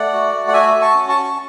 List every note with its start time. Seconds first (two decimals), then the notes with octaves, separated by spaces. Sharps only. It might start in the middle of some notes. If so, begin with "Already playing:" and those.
Already playing: A3 D5 F#5
0.13 F#4
0.33 A3
0.48 F#5
0.54 F#4 E5 G#5
0.74 F#4
0.81 A5 C#6
0.95 C#4
1.09 A5 C#6
1.16 F#4